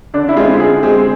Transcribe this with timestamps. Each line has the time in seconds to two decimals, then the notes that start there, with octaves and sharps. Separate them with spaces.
0.14 D3 D4
0.29 E4
0.36 G#3 C4 F4
0.59 D3 G#4
0.83 G#3 C4 G#4